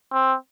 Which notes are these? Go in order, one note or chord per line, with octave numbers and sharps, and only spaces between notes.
C4